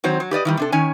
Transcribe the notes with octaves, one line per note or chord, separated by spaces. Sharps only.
D#3 F#3 C4 C5
F#3
G4 B4 D5 D#5
D#3 E3 G3
C3 D4 A4
D#3 C#4 C#5 G#5